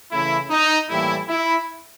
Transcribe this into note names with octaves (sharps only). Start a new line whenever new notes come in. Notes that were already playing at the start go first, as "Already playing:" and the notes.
C#3 E3 A3 C#4 E4
D#4
A2 E3 G3 A#3 E4
E4